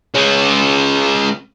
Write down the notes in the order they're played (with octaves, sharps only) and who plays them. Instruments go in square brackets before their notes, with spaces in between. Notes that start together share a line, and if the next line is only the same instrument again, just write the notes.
[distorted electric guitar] G#3 C#4